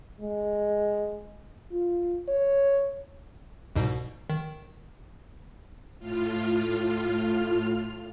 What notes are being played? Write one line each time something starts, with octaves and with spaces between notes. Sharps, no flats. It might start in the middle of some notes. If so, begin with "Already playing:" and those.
G#3
F4
C#5
C2 G#2 B2
D#3
A2 F4 F6